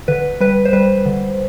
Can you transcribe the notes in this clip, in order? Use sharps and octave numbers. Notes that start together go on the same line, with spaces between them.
D3 B4
G3 B4
C5
G3 B4
D3